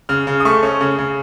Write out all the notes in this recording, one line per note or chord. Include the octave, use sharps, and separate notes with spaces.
C#3 F6
C#3
D#6
A3 C#6
C#4
C#3
C#3